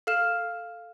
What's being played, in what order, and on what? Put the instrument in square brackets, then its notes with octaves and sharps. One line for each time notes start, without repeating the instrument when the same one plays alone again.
[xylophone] A4 F5 F6 E7